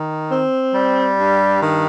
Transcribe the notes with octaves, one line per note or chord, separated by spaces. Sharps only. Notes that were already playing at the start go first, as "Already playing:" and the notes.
Already playing: D#3
C4
G3
G2
D#3